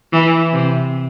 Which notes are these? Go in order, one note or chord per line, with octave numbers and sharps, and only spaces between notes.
E3
C3